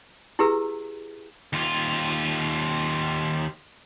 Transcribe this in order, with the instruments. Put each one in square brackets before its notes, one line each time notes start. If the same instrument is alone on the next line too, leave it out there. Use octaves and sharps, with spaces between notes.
[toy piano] E4 G4 G#4 B4 A#5 E6
[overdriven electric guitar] D#2 F4